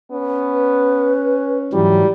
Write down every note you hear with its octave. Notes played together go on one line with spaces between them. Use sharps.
B3 C#4
B4
G#2 E3 F#3 G3